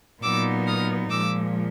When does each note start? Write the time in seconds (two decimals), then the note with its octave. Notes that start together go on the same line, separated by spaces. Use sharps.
0.21 A#2 F#3 B3 D#4 D6 E6
0.66 D#6 F6
1.09 A#2 F3 G#3 D6 E6